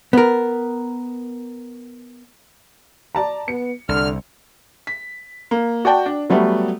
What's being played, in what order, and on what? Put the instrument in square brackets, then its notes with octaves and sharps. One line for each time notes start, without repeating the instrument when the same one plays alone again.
[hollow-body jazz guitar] B3 A#4
[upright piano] D5 A5 A#5
[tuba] B3 [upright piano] C#7
[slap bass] C2 [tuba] D3 [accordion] F6
[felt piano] B6
A#3
F#4 D5 G5 A5
D4
F#3 G3 A3 B3